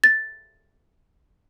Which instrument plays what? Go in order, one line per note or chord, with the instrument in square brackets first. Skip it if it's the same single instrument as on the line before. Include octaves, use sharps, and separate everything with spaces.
[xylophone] A6